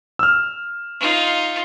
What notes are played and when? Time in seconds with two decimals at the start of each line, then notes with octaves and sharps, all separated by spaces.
0.19 E6 F6
1.00 D#4 F4